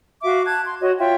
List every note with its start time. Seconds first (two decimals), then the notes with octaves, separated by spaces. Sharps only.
0.22 F#4 E5 F5 D6
0.45 A5 F#6 G#6
0.65 C6
0.80 F#4 C#5 D#5
0.98 F4 C#5 E5 G5